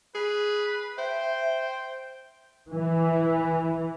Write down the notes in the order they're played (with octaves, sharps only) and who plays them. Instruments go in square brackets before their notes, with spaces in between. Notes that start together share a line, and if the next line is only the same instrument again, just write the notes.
[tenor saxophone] G#4 [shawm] B4
[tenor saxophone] C5 [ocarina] E5 [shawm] G5
[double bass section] E3